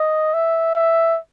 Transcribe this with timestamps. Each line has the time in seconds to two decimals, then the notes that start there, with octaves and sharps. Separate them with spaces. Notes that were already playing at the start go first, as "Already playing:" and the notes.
Already playing: D#5
0.34 E5
0.75 E5